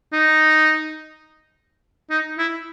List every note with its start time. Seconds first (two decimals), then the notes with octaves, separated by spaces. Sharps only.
0.12 D#4
2.10 D#4
2.38 E4